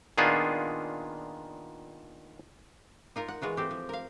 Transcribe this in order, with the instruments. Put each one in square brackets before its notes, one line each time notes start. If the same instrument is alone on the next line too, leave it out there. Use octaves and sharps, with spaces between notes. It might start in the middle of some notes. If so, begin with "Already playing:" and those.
[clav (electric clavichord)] A#2 D#3 B3 D4 F4 G#4
[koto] D#4 F4 A#4
F#5
E3 G#3 F4 F#4
A3 C4 G4
F3
A#4 F5